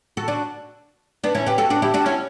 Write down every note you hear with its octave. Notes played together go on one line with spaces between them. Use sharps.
F#4 A4
D4 F#4
B3 D4
C#4 E4
G4 B4
F#4 A4
D4 F#4
E4 G4
D4 F#4
C#4 E4